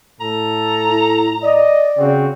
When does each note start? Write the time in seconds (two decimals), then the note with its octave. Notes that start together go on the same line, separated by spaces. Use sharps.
0.20 A2 A4 A#5
0.89 E4
1.42 D5 D#5
1.98 C#3 C4 F#4 G5